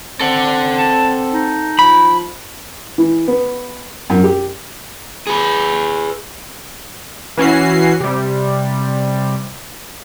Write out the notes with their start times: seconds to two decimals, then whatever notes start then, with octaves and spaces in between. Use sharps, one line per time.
0.20 C4 A4 F#5
0.78 A5
1.33 D#4
1.79 F3 B5
2.98 E3
3.28 B3
4.10 F#2
4.23 G4
5.27 G#4 B4
7.37 E3 C#4 F#4 C7
8.00 C3 G3